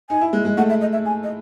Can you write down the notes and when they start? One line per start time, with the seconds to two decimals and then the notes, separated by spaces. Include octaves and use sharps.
0.10 D#4 G#5
0.21 E4
0.33 G#3
0.45 G#3
0.57 A3 F#5
0.70 E5
0.81 D#5
0.93 E5
1.06 G#5
1.23 D#5